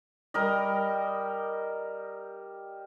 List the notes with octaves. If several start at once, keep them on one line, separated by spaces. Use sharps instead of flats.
G3 A#4 D#5